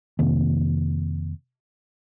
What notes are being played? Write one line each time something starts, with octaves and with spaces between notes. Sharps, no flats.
F2 C3 D#3 A#3